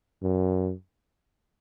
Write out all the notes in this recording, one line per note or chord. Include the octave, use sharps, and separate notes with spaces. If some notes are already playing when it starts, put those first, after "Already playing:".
F#2